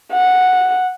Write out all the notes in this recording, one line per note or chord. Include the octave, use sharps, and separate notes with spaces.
F#5